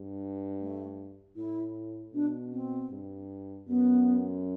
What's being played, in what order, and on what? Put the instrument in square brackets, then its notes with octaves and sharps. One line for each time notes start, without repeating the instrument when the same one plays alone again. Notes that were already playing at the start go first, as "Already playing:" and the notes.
Already playing: [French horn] G2
[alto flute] A3
[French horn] A2 [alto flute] E4
[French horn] B2 [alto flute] D4
[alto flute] C4
[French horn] G2
[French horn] F#2 [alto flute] B3